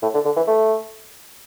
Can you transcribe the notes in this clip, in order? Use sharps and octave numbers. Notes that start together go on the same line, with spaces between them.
A2
D3
D3
E3
A3